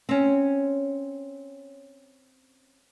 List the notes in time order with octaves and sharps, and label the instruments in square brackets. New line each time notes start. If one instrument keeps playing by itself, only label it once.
[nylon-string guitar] C4 C#4